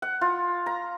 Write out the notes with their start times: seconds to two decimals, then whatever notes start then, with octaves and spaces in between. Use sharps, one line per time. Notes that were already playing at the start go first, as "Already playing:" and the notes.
0.02 F#5
0.21 F4
0.66 A#5